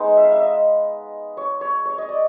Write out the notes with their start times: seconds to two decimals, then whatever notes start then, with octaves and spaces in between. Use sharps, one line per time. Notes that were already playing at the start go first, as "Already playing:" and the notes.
Already playing: G#3 B3 D#4
0.17 E5
0.24 F5
0.32 E5
0.41 D#5
1.37 C#5
1.61 C#5
1.86 C#5
1.98 D#5
2.09 D5